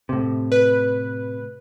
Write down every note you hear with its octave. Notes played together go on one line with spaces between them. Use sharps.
A2 C3
B4